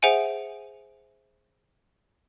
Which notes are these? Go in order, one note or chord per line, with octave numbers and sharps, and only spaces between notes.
G#4 C5 E5 F#5 G#5 D7